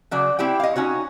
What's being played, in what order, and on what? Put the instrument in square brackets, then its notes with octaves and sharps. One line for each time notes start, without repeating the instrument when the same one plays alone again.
[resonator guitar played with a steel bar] C#3 F#3 D5
C4 E4 G4 G5
D#5 F5
C#4 D#4 F#4 C#5